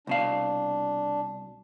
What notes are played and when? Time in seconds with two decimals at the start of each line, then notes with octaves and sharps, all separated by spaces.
0.07 C2 B2 D4 F5